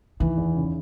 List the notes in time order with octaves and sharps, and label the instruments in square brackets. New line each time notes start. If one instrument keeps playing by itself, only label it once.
[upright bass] D#3 [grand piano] E3
[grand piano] E2
C#3